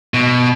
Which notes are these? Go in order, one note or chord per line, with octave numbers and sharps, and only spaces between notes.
B2